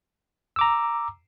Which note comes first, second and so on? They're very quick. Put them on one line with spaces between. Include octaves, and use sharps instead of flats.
E6 D6 A#5